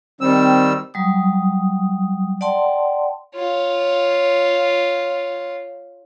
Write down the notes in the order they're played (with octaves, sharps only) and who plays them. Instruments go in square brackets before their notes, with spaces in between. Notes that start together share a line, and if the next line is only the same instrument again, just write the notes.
[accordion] D#3 G3 E6 [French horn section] C4
[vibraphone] F#3 G3 D#6
D5 F#5 G5 A5 C6
[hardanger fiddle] F4 C#5